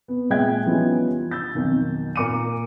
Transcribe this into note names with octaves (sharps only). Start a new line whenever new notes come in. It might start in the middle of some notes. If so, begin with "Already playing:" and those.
B3
A#2 G#3 E5 G5 F#6 G#6
E3 F3 G3 B3 C#4 D#4
E6 G6 A6
B1 F2 D#3
A#2 A#3 A#5 D6 C#7 D#7